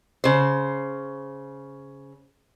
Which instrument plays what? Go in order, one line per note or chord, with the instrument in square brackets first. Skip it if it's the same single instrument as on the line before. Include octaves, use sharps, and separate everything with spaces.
[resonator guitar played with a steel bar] C#3 C5